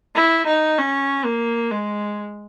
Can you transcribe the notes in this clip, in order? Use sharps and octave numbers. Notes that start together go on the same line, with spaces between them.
E4
D#4
C#4
A#3
G#3